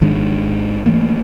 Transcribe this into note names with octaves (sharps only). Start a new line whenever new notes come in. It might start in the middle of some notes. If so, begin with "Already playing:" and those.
G#1 D#3 G#3 D4
E3 A3 A#3